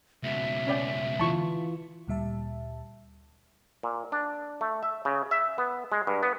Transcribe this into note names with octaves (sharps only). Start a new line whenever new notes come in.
C#2 B2 E5
C#4 D5 G5
E3 E4 F4 A5 C#6
D2 A#2 G3 E5 A5
A#2
D4
A3
E5
C#3
E5
B3
G#3
G2
B3